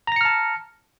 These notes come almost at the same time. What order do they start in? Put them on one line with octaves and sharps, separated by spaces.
A#5 A#6 C#7 F6 A5